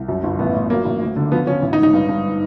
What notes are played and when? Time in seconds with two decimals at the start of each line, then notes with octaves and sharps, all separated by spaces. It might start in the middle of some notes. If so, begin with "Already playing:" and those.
Already playing: C2
0.08 F#2
0.23 G1
0.39 A1 B3
0.54 A2
0.70 F#3 A#3
0.85 A1
1.01 D2
1.16 D3
1.32 F3 B3
1.47 F3 C#4
1.62 A1
1.73 D#4
1.78 G#2
1.83 D#4
1.93 G2
2.09 G2